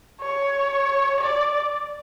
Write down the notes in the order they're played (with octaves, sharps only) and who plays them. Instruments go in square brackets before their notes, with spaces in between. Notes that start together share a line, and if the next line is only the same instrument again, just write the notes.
[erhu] C#5
D5